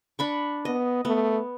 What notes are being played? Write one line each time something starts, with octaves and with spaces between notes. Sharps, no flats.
D4 B5 C#6
B3 D#5
A3 B3